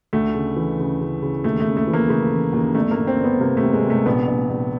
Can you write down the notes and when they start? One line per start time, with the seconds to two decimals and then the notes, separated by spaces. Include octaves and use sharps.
0.13 D2 A3
0.35 C#3
0.56 E3
0.79 C#3
1.01 C#3
1.22 C#3
1.44 D#2 A3
1.60 A3
1.67 C#3
1.77 A3
1.87 E3
1.93 A#3
2.09 C#3 A3
2.32 E3
2.53 D#2
2.75 G1 A3
2.91 A#3
2.98 G1
3.07 C4
3.18 G1
3.24 B3
3.40 C3 A#3
3.57 A3
3.62 C3
3.73 G#3
3.85 C3
3.90 A3
4.06 A#1 B3
4.28 A#1
4.50 A#1